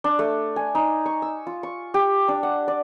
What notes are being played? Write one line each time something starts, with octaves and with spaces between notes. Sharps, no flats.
D4
A3
G#5
D#4
C#6
E6
F4
C#6
G4
D4
F#5
D5